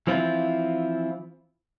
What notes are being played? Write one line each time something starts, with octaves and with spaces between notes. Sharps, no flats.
E3 F3 C4 E4 F4